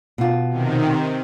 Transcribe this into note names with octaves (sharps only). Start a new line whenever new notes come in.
B2 F4
C3 D#3